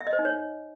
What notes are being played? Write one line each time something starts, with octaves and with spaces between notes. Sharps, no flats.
E5
D#5
C5
D#4
C#5